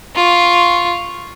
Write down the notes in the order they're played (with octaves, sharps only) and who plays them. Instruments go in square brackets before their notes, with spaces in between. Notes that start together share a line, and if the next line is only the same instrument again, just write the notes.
[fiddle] F4 C#6